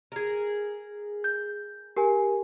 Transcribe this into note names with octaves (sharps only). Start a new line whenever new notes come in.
G#4 A#4
G6
G4 A#4 G#5